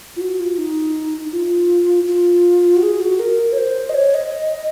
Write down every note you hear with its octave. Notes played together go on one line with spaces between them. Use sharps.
F4
F#4
F4
D#4
F4
F4
F#4
G#4
F#4
A#4
C#5
C5
D#5
C#5
D#5